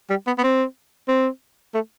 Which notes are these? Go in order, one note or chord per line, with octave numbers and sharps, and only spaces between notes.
G3
B3
B3
C4
C4
A3